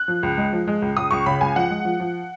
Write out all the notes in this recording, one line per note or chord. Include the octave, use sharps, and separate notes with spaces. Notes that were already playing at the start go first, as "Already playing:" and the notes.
Already playing: F#6
F3
C#2
G#3
F3
G#3
C#2
C#2 D#6
C#2 C#6
C#3 B5
C#2 G#5
F3 F#5
G#3
F3
F3